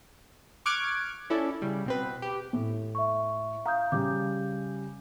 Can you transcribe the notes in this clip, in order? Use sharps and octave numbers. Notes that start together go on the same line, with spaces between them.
C#6 D6 F6 F#6 G#6 D7
C#4 E4 A4 D5
C#3 G3
B2 C4 B4
G4
A2
E5 C#6
F5 A#5 D#6 G6
C#3 G3 D6 G6